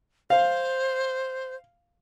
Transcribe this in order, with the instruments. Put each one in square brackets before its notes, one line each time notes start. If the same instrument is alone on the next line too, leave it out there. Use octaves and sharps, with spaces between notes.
[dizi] C5 [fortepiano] F5